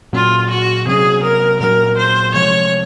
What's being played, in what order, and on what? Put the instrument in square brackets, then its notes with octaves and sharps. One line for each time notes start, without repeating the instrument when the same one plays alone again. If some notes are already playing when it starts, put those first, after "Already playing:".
[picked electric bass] A#2 F#3 C#4 [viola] F4
[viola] F#4
[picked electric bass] C3 F#3 C#4 [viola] G#4
[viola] A#4
[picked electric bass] A#2 F#3 C#4 [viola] A#4
[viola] C5
[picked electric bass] C3 F3 G#3 [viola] C#5